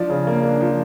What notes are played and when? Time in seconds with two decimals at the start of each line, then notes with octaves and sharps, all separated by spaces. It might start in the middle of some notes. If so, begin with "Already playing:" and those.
Already playing: F3 D4 D5
0.10 C#3
0.27 A#3
0.43 D4
0.61 F3